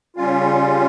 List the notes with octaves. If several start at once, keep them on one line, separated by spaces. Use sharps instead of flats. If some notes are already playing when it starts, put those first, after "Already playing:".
C#3 G3 C#4 F4